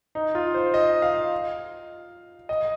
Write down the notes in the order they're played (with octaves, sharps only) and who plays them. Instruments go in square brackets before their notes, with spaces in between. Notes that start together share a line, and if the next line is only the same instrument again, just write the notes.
[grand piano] D#4
F4
C5
D#5
F5
D#5